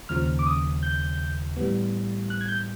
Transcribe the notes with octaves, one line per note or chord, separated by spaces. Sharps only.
D#2 C#3 F3 F6
D6
D#6
G6
A2 E3 G3 B3
F#6
G#6
G6